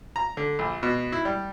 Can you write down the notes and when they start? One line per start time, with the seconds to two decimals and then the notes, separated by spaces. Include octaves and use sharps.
0.16 A#5
0.37 D3
0.59 A#1
0.83 B2
1.12 E4
1.25 G3